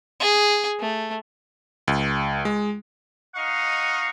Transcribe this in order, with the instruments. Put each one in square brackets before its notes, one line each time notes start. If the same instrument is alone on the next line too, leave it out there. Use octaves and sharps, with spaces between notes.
[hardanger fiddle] G#4
A3
[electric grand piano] C#2
G#3
[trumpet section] D#4 D#5 F5 F#5 C#6